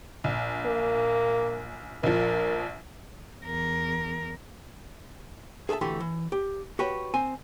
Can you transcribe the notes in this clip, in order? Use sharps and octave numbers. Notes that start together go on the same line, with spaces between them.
A#1
A#3
A#1 F3 A#4
E2 A#4
G#4 A4 B4 E5 A5
D2 E3 A3 G4 C6
E3
G4
F#4 G4 B4 C#5
C4 C5 G#5